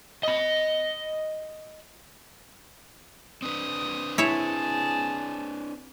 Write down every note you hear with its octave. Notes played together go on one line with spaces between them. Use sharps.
D#5 B5
C4 D4 B4 D#6
E4 G#4 C#5 E5 A5